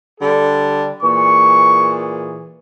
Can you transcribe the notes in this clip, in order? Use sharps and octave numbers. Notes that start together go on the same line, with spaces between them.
D3 G3 A4
A#2 E3 G#4 C#6